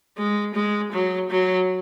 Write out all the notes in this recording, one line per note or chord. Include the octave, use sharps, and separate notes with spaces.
G#3
G#3
F#3
F#3